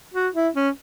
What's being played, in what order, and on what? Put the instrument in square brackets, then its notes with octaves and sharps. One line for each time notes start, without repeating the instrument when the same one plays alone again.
[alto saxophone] F#4
E4
C#4